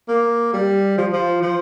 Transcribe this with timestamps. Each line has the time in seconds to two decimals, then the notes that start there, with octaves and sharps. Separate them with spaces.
0.08 A#3
0.53 G3
0.98 F3
1.13 F3
1.42 F3